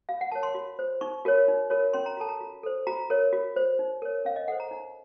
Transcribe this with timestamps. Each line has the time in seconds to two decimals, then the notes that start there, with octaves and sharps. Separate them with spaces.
0.09 F#4 F5
0.21 F#5
0.32 A#4 C#5 A5
0.43 C6
0.54 F#4
0.79 C5
1.01 D#4 C#6
1.25 F#4 A#4 C#5
1.48 D#4
1.70 F#4 A#4 C#5
1.93 C#4 C6
2.06 A#5
2.17 F#4 A4 A5
2.29 A#5
2.41 F#4
2.63 A4 C5
2.87 F#4 A#5
3.10 A#4 C#5
3.33 F#4
3.56 C5
3.79 D#4
4.02 A#4 C#5
4.25 C#4 F5
4.36 D#5
4.48 A4 C5 F#5
4.60 A#5
4.71 D#4